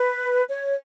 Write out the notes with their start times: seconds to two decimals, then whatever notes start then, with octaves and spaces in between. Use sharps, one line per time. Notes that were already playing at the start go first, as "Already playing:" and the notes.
Already playing: B4
0.49 C#5